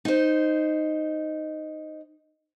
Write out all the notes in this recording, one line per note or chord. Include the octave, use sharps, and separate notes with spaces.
D#4 C5